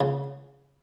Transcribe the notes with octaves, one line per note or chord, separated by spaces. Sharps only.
C#2 C#3